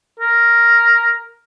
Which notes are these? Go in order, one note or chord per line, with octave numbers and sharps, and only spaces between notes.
A#4